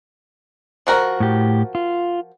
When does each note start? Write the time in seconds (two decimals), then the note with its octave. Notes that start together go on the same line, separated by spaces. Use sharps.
0.87 F3 F#4 A#4
1.20 A2 G4
1.75 F4